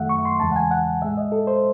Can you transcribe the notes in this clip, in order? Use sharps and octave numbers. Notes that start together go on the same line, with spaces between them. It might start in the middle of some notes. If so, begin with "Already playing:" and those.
Already playing: F#2 D#3 F#3 A3 E5 F#5
C#6
C6
E2 C#3 E3 G#3 A5
F#5
G#5
F#5
A2 G#3 E5
D#5
A4
C5